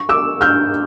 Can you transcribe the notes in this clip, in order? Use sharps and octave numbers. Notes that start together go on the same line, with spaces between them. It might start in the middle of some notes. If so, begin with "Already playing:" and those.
Already playing: C#6
D6 E6
F6 G6